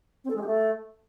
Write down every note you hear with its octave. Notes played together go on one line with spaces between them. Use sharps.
C4
A4
G#3
G4
A3